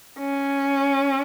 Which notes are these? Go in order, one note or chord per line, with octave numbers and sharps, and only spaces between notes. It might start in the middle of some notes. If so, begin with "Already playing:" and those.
C#4